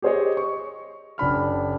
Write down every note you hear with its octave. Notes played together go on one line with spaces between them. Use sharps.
G4 G#4 C5 C#5 D#5
C#6
F#1 D4 B5 F6